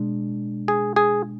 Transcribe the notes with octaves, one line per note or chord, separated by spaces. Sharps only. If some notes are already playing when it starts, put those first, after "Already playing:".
Already playing: B2 G#3 D4
G#4
G#4